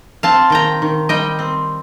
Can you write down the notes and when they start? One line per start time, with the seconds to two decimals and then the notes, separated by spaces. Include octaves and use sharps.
0.23 C4 F5 A5
0.50 D#3 G5 A#5
0.82 D#3
1.09 G3 D#5 G5
1.39 C4